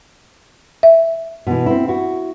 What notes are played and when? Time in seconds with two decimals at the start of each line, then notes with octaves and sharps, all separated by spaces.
0.83 E5
1.47 B2 E3
1.66 C4 E4
1.88 E4 F#4